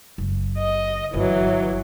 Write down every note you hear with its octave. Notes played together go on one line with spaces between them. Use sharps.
F#1
D#5
G1 E3 F#3